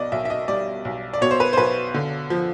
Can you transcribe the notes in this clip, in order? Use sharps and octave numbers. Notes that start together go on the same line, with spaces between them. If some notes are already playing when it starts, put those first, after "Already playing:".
Already playing: B1 B2 D5 D#5
B1 E5
E5
D#5
G3 D5
B1
D5
B2 C#5
C5
B4
C5
B1 B4
D3
F3